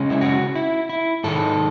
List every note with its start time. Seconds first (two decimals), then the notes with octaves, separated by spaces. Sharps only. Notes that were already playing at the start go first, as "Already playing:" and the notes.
Already playing: C#3 G#3 C#4
0.10 E4
0.21 F#4
0.56 E4
0.89 E4
1.24 G#2 D#3 G#3 A4